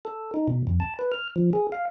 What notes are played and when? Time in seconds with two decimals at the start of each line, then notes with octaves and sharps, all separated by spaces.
0.05 A4
0.34 D#4
0.48 B2
0.67 F2
0.80 A5
0.99 B4
1.12 F6
1.36 F3
1.53 G#4
1.72 F5